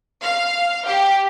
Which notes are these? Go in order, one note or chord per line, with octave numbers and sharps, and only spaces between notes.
F5
G4